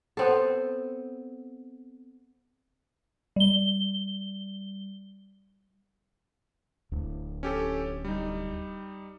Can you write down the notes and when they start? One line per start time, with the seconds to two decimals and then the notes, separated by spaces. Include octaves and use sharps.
0.17 B3 C4 A4
3.36 G3 G7
6.92 D1 D2
7.43 C#4 G4 A4
8.05 G3 D#4